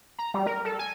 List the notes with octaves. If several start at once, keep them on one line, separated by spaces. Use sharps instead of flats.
A#5
G3
A#4
A4
G#5